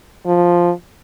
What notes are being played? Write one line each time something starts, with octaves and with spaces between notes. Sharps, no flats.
F3